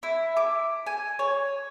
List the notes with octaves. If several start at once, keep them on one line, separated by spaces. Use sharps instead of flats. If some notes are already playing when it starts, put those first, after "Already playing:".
E4
D6
G#5
C#5